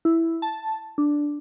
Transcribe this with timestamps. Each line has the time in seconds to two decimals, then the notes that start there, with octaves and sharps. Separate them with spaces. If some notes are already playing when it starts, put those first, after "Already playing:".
0.05 E4
0.42 A5
0.98 D4